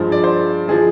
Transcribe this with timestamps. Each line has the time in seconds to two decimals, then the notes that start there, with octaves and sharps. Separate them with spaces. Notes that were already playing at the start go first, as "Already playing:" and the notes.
Already playing: G2 F3 G#3 C5
0.12 D5
0.24 C5
0.68 F3 G#3 G#4